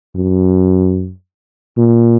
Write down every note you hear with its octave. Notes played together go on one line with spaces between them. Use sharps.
F#2
A#2